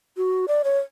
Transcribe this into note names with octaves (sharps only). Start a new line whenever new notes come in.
F#4
D5
C#5